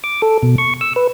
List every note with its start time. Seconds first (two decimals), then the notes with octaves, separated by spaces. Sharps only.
0.04 D6
0.22 A4
0.43 B2
0.58 C#6
0.81 E6
0.96 B4